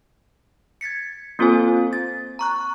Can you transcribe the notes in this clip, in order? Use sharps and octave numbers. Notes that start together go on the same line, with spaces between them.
G#6 A6 B6 C#7
A#3 C4 F4 A4 C5 G#5
A6
A#5 C#6 F#6